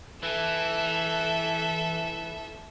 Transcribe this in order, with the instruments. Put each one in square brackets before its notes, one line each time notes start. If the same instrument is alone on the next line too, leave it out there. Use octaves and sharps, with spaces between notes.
[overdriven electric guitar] E3 [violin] A4 E5